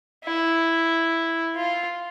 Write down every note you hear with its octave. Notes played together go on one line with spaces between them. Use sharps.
E4
F4